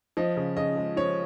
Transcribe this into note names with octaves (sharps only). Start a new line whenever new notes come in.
F3 D#5
C#3
C#3 D#5
G#3
F3 C#5